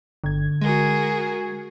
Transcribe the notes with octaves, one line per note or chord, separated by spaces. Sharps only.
G1 D3 G#6
G#3 F#4 G#4 A#4